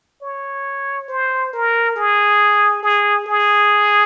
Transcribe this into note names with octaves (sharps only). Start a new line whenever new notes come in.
C#5
C5
A#4
G#4
G#4
G#4